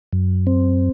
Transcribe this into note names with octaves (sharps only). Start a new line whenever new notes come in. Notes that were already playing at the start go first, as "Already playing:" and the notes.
F#2
C4